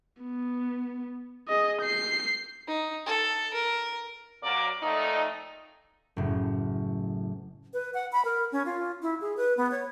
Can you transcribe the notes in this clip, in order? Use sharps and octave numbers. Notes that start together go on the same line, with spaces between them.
B3
G#4 D#5
G6 C7
D#4
A4
A#4
F#2 C3 F#3 A#3 A#4 D5
F2 A#2 A3 D#4
F#1 A2
B4
F#5
B5
A#4
C#4
F4
E4
G#4
B4
B3
C#5